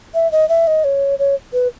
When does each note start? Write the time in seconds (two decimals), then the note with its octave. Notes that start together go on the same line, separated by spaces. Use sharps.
0.14 E5
0.32 D#5
0.49 E5
0.67 D#5
0.84 C#5
1.19 C#5
1.53 B4